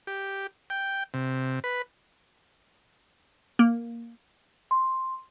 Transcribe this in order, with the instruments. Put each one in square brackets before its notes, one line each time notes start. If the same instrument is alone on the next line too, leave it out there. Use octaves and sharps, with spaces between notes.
[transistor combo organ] G4
G5
C3
B4
[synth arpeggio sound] A#3
[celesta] C6